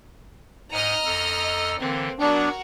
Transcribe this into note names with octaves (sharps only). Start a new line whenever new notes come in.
G#2 D#5 F#5 G#5 A#5 F6
F2 A4 E6
D3 E3 A#3 C4
F#3 B3 D4 F#4 A#4